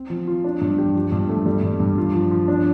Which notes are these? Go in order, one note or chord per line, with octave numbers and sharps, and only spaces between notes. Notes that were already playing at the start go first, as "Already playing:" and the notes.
Already playing: C4
F3
F4
D4
G2
G4
F3
G2
A3
G3
G2
G2
F4
F3
F3
D4